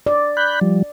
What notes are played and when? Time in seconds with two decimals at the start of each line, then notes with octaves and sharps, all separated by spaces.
0.07 D5
0.37 B5 F#6 G6
0.61 F3 G3